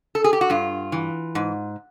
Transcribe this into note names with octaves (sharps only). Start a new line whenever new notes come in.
A4
G#4
G4
F#4
G2 F4
E3
G#2